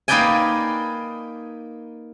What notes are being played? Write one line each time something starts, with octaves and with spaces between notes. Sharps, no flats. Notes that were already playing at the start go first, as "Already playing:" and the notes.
A#3 D#4 B4 D5 G5 G#5